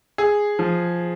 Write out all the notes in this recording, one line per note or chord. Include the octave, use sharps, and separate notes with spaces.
G#4
F3